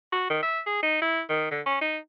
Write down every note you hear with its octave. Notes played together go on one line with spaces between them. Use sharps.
F#4
D#3
E5
G#4
D#4
E4
D#3
D3
C#4
D#4